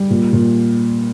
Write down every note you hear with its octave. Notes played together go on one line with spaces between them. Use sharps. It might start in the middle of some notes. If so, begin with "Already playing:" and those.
Already playing: G3
A#2
A#2